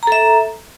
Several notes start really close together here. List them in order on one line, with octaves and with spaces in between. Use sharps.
A#5 A4 E5